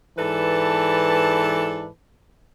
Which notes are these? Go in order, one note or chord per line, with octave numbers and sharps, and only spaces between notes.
G#2 E3 A4 B4 D5 A5